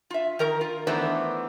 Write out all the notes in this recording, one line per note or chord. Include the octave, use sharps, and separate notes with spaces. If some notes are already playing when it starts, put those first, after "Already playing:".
F4 E5
D#3 A#4 A#5
F4
D#3 E3 A3 B3 D4 C5